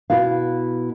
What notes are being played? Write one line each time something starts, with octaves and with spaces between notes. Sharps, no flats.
B2 B3 E4 F#4 F5